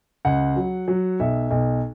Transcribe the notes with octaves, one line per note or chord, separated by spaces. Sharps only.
C#2 F#5
F#3
F#3
B1 E5
B1